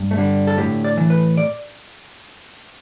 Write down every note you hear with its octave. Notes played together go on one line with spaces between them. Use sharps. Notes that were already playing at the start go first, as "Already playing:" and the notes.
Already playing: G2
A3
D3 G3
A4
A2 G4
D5
E3
B4
D5